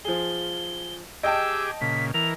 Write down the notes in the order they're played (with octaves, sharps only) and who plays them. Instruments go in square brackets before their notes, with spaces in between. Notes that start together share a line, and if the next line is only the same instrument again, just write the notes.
[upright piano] F3 G#4 [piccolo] G7
[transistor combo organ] G4 G#4 D6 [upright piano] D#5 G5 A5 [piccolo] E6
[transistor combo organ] A#2 C#3 [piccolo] B6
[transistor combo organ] E3 A#4 [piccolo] F7